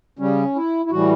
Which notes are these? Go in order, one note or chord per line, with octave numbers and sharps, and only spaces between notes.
C#3 G3 C#4
E4
E4
A2 E3 G3 F#4